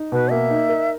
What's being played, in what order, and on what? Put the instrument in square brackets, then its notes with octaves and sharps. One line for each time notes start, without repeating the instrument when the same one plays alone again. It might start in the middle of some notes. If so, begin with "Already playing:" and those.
Already playing: [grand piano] D#4
[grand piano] B2 [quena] B4
[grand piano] A#3 [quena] E5
[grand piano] D#4
A#4